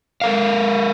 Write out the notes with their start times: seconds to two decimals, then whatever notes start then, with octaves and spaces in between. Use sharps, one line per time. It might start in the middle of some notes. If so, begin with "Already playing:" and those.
0.21 A4 A#4 F5